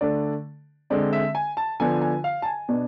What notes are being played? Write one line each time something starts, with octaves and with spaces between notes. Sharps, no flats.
D3 A3 D4 D5
D3 G#3 C4 D5
E5
G#5
A5
D3 F3 B3 D4 G#5
G#5
F5
A5
G#5
B2 B3 D4